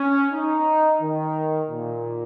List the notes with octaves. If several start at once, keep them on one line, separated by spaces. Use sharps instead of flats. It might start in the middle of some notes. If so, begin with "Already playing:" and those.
Already playing: C#4
D#4
D#3
A#2